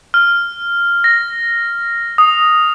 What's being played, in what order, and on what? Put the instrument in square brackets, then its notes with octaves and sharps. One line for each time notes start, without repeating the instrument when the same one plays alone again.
[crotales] F6
A#6
D#6